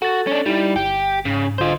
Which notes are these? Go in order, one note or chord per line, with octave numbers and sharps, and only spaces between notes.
F#4 A4 A6
C#4 D4
G3 D#4 E4
G1 G4
G#2 C#3
B1 D3 F4 C5 D#5